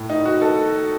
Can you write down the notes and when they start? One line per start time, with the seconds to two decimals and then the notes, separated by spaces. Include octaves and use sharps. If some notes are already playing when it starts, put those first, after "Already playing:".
Already playing: A2
0.10 D#4
0.26 F#4
0.41 A4